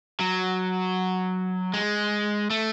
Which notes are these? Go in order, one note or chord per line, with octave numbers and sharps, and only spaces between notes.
F#3
G#3
A3